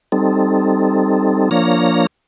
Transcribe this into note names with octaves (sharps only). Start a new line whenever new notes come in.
G3 C4 D#4 A4
F3 A#3 D4 C#5 F6 A#6